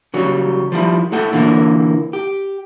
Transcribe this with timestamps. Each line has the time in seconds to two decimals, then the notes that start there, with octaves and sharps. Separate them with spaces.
0.14 C#3 F#3 G3
0.72 F3 G3 E4
1.12 A3 E4 A4 F#5 G5
1.33 A#2 D3 E3 A#3 E4
2.13 G4